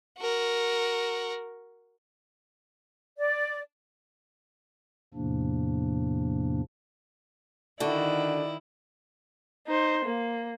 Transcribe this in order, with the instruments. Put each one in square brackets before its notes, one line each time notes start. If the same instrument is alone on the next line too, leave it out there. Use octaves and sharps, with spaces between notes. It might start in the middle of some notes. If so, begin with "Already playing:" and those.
[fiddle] F#4 A#4
[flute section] D5
[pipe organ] E2 A2 C3 F3 A#3 D4
[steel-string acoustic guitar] D3 F#4 [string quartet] D#3 E4 [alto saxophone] D5
[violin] D#4 C5
A#3